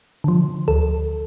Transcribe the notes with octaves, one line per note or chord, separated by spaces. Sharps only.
D3 F3
D2 A4